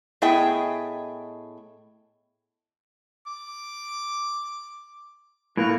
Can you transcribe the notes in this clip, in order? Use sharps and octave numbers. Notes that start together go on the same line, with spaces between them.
A2 B3 G#4 D#5 E5 G5
D6
A2 A#3 F#4